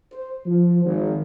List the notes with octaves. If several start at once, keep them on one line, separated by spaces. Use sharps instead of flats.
C5
F3
G#1